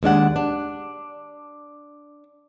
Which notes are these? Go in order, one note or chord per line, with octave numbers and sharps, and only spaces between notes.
D#2 G#3 D4 F#5
D4